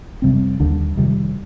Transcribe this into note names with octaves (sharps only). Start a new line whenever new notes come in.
F2 C3 G3 C4
D#2 D3 G3 D4
F2 C3 D#3 G3